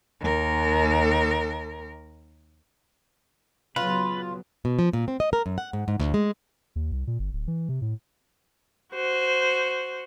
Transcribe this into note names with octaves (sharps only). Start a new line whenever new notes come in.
D#2 A#4
C#3 F#3 B3 F4 B4
B2
F3
A#2
C4
D#5
A#4
F#2
F#5
G#2
G#2
D2
G#3
D#2
C2
A#2
G1
D1
E3
C3
A2
F#4 C5